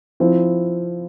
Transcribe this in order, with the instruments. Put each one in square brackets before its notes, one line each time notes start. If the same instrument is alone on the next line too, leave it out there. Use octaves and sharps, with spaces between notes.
[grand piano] F3 C4 E4